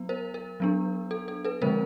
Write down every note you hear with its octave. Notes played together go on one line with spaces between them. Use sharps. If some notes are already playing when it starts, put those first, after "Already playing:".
Already playing: F#3 B3
A#4 C5
A#4
F#3 B3 D4
A4
A4
A4 B4
D3 F3 G#3 C4 A#4 C5